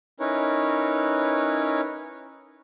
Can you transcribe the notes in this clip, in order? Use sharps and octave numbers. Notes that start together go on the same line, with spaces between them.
C#4 D#4 E4 A#4 B4 C#5